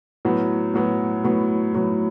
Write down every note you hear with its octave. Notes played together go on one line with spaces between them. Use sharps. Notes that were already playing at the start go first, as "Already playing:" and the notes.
A2 F#3 B3
A2 F#3 B3
A2 F#3 B3
A2 F#3 B3